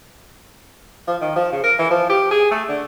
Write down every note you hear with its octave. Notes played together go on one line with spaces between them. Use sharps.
F3
D#3
F3
C#3
A#4
E3
F3
G4
G#4
A3
D3